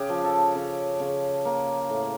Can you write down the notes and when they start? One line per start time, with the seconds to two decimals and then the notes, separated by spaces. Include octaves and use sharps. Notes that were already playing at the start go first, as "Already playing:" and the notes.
Already playing: C#3 G4
0.09 F3
0.25 A4
0.55 C#3
1.00 C#3
1.45 A#3
1.90 A2